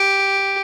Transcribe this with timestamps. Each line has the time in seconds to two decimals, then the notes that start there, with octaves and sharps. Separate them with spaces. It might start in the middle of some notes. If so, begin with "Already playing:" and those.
Already playing: G4